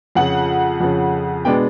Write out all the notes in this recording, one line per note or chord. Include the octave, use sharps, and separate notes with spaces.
F2 C#3 F3 F#5
F2 C#3 F3
B2 G#3 B3 D4 G5